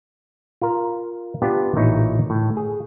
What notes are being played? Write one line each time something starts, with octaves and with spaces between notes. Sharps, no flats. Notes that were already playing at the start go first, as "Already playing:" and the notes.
F4 A#4
B3 D4 F4 G4
A1 A#2 D#4 E4 C#5
A2
G#4